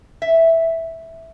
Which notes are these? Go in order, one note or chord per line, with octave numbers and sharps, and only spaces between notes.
E5